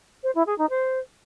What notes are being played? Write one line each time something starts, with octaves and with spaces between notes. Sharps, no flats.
C5
E4
G#4
D#4
C5